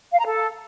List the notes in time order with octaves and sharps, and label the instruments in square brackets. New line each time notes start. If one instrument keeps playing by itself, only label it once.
[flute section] F5
A#5
A4